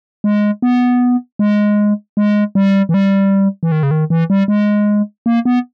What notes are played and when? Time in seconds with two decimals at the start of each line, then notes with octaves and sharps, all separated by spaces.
0.24 G#3
0.62 B3
1.39 G#3
2.17 G#3
2.55 G3
2.89 E3
2.94 G3
3.63 E3
3.72 D#3
3.83 C#3
3.91 D#3
4.10 E3
4.30 G3
4.48 G#3
5.26 A#3
5.45 B3